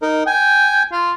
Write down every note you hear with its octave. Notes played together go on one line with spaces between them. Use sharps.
D#4 A#4
G5 G#5
F4